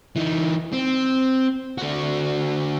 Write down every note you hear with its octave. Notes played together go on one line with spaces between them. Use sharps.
E3 D#4
C4
D3 F#4